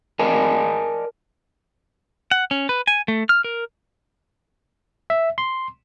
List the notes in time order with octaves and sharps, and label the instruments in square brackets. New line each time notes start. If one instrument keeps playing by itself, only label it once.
[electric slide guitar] A#4 D5 D#5 G#5 A5
[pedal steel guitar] F#5
C#4
B4
G#5
A3
F6
A#4
[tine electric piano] E5
C6